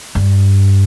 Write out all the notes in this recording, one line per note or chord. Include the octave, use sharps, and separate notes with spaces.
G2